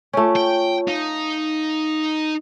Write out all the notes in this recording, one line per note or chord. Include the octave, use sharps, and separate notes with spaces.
A3 C#4 F4 C#5
G5
D#4 F5